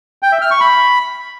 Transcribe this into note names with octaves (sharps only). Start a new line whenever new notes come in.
G5
E5
F6
C#6
B5